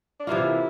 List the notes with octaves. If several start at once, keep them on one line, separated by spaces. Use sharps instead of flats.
D4
C3 E3 A#3 E4 F4